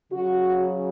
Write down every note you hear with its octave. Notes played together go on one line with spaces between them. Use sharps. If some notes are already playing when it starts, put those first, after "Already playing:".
C#3 F#3 C#4 F#4